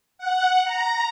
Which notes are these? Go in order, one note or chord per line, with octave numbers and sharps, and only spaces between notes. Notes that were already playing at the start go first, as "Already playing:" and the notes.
F#5
A#5